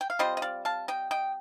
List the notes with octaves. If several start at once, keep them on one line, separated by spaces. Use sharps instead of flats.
G5
F5
G3 C4 F4 C5 D#5
D#5
D5 F5
F5 A5
D#5 G5
D#5 G5